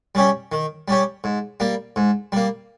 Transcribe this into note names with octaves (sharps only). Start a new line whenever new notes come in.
G3 C#4 G4
D#3
G3 C#4 G4
G#2
G3 A#3
G#2
G3 A#3